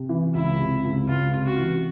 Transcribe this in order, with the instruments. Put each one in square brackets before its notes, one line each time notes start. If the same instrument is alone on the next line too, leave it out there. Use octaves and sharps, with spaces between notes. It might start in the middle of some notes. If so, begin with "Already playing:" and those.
Already playing: [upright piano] C3
E3
[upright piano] C#2 [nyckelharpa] E4
[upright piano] C3
C#2
[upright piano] C#2 [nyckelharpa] F4
[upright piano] C3
[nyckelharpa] F#4
[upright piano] E3